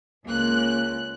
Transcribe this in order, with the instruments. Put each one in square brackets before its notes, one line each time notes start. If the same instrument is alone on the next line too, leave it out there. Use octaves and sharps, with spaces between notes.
[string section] C#2 F#6 [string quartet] A#3